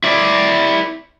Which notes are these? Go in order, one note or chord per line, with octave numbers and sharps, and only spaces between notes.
E4 D5